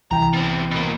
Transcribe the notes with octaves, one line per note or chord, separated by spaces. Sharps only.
C2 E3 G5 A#5
B2 C4
B2 A#3